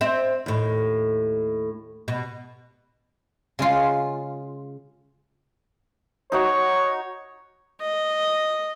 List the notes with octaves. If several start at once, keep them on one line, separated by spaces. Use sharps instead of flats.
C4 E5
D#2 A2
B2
C#3 G#3 F4
D#4 F#4 C#5 C#6
D#5